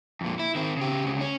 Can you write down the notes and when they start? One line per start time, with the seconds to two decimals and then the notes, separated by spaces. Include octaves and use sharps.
0.21 F2 A#2
0.39 E4
0.55 D#3 C4
0.77 C#3 G4
1.05 D2 C#3
1.21 C#4